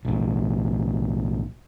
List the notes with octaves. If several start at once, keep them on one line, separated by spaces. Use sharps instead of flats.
B1 A2